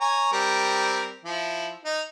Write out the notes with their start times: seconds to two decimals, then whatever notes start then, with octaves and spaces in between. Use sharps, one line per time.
0.01 C#5 G#5 A#5
0.33 G3 C4 A#4
1.25 F3 E4
1.85 D#4